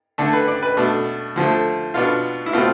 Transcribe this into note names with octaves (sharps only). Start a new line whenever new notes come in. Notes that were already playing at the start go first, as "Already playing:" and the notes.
D3 A3 D4 A4
B4
D5
B4
B2 A3 D4
D3 F3 A3
B2 B3 D4 F4
E4
B2 A3 C4 F4